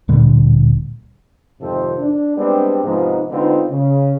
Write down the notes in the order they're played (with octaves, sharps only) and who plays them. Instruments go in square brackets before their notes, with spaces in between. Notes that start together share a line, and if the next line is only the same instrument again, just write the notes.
[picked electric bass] D1 A#2 D3 G3
[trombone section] F2 G#2 C3 D#3 A4 C5
D4
G3 G#3 B3 C4 D4
G#2 C3 F3 G#3 B3 D#4
D3 G#3 B3 C4 D#4 F4
C#3